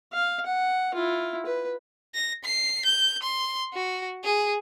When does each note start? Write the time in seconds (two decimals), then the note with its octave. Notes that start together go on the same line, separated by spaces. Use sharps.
0.13 F5
0.46 F#5
0.94 E4 F4
1.46 B4
2.14 A#6
2.44 C7
2.85 G6
3.23 C6
3.73 F#4
4.24 G#4